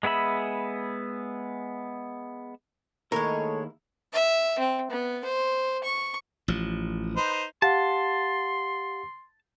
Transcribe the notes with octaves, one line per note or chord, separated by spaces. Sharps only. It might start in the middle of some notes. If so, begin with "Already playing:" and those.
G#3 B3 G#4 E5 B5
D#2 G#3 A3 E4 A#4 C#5
E5
C4
B3
C5
C#6
A1 F3
D#4 B4 C5
G4 F5 F#5 A5 C6